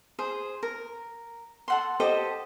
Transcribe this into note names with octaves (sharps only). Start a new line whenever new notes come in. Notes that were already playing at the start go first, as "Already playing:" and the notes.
G#4 C5
A#4
A4 F#5 C6
G4 A4 C5 D#5